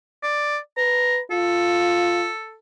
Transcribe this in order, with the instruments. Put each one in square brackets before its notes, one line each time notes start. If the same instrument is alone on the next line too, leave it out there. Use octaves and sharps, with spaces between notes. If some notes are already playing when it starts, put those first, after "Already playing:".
[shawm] D5
[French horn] B4 [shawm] A#5
[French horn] F4 [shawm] A4